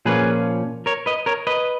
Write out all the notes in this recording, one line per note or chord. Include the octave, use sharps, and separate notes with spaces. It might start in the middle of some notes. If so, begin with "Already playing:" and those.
A#2 F3 A#3 C#4 G#4 B4
A#4 C#5
B4 D#5
A#4 C#5
B4 D#5